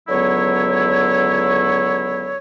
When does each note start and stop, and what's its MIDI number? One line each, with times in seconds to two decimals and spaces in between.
0.08 2.37 37
0.08 2.37 50
0.08 2.37 54
0.08 2.37 59
0.08 2.37 64
0.08 2.37 73